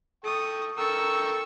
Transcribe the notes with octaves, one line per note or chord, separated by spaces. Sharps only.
A4 G5 C#6 D#6
A4 A#4 G5 C#6 E6